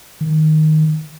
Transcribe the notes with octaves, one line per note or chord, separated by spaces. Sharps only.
D#3